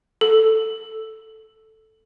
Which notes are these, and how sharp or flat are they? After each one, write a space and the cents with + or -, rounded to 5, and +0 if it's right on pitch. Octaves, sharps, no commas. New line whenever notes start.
A4 +0